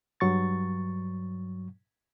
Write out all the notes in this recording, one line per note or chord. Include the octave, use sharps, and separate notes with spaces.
G2 F#3 C#6 A6